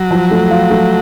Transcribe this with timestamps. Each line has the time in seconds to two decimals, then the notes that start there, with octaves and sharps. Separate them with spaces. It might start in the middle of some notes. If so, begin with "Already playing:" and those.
Already playing: F#3
0.11 F3
0.31 A3
0.51 F4
0.71 A3